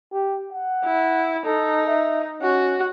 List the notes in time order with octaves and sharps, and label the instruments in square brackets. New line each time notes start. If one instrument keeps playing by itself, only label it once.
[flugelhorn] G4
F#5
[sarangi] E4
[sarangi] D#4 [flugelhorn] A4
[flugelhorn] E5
[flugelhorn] C#4 [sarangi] F#4